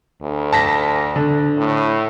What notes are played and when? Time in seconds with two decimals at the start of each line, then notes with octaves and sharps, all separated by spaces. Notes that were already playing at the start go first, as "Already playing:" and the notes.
0.22 D2
0.52 A5 A#6 B6
1.16 D3
1.58 A2